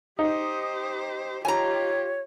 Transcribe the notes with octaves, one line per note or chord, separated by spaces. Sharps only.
D#4 G4 C5 D#6
F4 G4 C#5 G#5 A#5